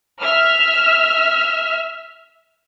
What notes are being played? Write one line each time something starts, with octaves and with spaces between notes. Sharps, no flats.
E5 F6